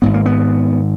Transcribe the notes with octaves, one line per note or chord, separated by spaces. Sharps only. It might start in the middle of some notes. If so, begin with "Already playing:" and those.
G#1 G#2 B3
A#3
B3